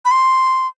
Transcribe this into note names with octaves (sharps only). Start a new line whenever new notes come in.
B5
C6